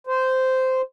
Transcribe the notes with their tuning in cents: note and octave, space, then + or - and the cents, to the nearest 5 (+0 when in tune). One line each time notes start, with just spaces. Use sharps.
C5 -10